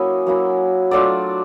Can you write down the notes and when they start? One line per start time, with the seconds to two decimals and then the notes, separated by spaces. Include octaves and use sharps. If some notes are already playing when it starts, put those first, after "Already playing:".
Already playing: F#3 A#3 C#4 E4 D#5
0.27 F#3 A#3 C#4 E4
0.91 F#3 A3 D4 F4 D5